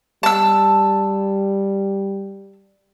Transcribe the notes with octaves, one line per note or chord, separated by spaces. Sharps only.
G3 A5 E6